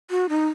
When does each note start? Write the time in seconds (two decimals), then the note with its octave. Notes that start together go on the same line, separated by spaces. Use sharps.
0.10 F#4
0.29 D#4